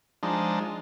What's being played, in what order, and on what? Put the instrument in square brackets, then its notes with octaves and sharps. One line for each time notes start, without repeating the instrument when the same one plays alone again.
[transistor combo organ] F3 G#3 D4 D#4